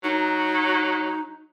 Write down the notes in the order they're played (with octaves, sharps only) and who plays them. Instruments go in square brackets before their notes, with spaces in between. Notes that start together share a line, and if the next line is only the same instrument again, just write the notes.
[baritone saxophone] F#3 [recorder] D#4